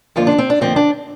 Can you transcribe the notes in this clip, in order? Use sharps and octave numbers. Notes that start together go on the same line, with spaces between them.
F2 D3 F3 A#3 F4
D4
C4
D4
F2 D3 F3 A#3 C4
D4